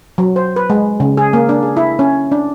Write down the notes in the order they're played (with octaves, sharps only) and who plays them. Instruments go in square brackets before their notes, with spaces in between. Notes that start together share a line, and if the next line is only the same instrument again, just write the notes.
[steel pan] F#3
C5
B4
G#3
C#3
G#4
A#3
D4
G#4
E4
C#4
D4